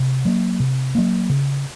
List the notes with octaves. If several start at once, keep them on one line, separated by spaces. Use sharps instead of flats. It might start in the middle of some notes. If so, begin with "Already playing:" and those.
Already playing: C3
F#3 A#3
C3
F#3 A#3
C#3